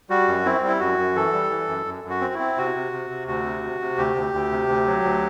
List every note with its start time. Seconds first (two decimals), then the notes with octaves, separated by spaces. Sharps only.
0.10 G3 F#4
0.28 F#2
0.45 C4 E4
0.63 G3 E4
0.80 F#2 F#4
0.98 F#2
1.15 E3 A4
1.33 G3
1.50 E3
1.68 F#2
1.86 F#2
2.04 F#2
2.10 F#4
2.21 C4
2.34 E4
2.39 C4
2.57 C3 F#4
2.75 C3
2.92 C3
3.10 C3
3.27 D2 F#4
3.46 C3
3.63 C3
3.80 C3
3.98 D2 G4
4.16 D2
4.34 D2
4.51 C3
4.68 D2
4.87 F#3
5.04 D2